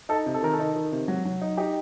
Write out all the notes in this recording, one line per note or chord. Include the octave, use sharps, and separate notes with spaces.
D#4 A4
C3
A4
D#3 A#4
A4
D#4
D#3
C3
F#3
F#3
D#4
D#4 G4